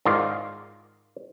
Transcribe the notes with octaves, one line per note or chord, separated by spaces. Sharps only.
G#2 D#3 F4 D5